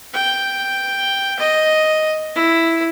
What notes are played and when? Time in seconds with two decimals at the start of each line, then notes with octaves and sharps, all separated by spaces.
0.14 G5
1.39 D#5
2.35 E4